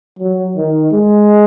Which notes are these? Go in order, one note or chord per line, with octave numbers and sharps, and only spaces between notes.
F#3
D#3
G#3